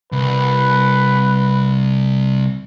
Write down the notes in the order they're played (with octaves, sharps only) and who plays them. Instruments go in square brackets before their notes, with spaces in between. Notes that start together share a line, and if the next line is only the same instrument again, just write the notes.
[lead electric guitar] C2 [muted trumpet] B4